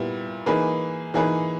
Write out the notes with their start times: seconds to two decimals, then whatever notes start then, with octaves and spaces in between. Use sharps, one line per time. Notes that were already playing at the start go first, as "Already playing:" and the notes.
Already playing: A#2 G3 B3 E4
0.46 E3 A#3 D#4 G#4 B4
1.14 E3 A#3 D#4 G#4 B4